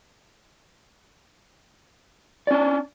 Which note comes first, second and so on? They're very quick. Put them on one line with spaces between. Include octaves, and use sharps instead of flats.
D5 C#4 D4